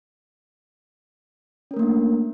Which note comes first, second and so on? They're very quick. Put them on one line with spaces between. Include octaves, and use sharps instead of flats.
C#4 A#4 A3 A#3 D4